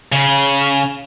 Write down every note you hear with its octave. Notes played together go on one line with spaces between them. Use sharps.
C#3